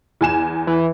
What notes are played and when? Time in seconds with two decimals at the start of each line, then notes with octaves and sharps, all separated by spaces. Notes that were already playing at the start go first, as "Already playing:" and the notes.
0.21 E2 G#5 E7
0.67 E3